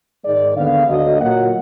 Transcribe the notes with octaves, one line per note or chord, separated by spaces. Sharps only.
G#2 D#3 G#3 D5
D#2 D3 G#3 B3 F5
D2 D3 F#3 D#5
A#2 F#3 A#3 F#5